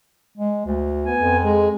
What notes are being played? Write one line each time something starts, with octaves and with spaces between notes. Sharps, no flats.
G#3
D2
B3 G#5
F2
G#3